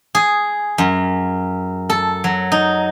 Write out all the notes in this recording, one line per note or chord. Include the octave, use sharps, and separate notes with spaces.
G#4
F#2
A4
F#3
D#4